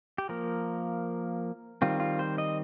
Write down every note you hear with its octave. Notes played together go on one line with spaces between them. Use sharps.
G4
F3 A#3 A#4
D#3 G3 C4 F4
F4
C5
D#5